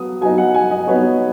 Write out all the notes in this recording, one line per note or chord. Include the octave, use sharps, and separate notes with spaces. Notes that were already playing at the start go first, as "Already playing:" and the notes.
Already playing: F#3 B3 D#6
F#3 B3 D#4 G#5
F#5
G#5
D#5
F#3 B3 D#4 C#5